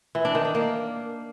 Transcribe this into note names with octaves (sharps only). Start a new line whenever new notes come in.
E3
D4
D#3
D4
A#3